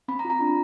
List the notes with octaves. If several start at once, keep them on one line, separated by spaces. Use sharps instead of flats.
C4 B5
A#5
F4
A#5
D4